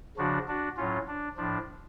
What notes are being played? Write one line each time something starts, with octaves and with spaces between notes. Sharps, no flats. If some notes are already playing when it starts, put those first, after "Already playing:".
C#3 F3 D4 F#4
D4 F#4
A2 F#3 C#4 F4
D4
A2 F3 D4